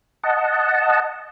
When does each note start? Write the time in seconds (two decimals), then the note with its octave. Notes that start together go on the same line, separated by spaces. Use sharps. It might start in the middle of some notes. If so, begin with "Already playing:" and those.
0.23 D#5 F#5 A5